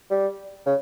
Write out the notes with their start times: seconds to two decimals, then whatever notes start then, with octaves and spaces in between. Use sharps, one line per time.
0.11 G3
0.66 C#3